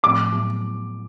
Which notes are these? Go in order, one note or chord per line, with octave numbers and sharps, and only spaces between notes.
A2 F3 A3 C4 D6
A2 F#3 B3